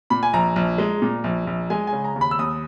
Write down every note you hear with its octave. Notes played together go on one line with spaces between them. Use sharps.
A#2 B5
G#5
A#1 A#5
A#1
G#3
A#2
A#1
A#1
G#3 G#5
G#5
C#3
A#5
D#2
B5
E6
D#2 D#6